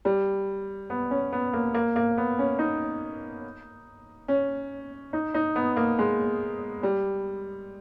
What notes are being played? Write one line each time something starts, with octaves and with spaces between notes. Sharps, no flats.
G3
B3
C#4
B3
A#3
A#3
A#3
B3
C#4
D#4
C#4
D#4
D#4
B3
A#3
G#3
G3